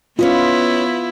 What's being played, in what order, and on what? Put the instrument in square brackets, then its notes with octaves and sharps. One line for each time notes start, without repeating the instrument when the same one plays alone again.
[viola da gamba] B3 E4 [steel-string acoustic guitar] C#4 B4 D#5 [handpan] F4